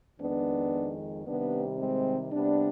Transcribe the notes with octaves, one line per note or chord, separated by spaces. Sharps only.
F2 D#3 G#3 B3 D4
C3 D#3 G3 B3 D4
G#3 C4
C3 G3 B3 D4